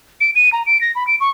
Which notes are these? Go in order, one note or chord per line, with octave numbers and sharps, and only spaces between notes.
D7
D#7
A#5
D7
A#6
B5
D7
C#6